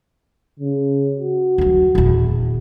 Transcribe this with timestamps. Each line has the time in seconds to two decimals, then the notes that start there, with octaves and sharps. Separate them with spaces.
0.60 C#3
1.16 F#4
1.58 D2 F#3
1.95 D#1 E2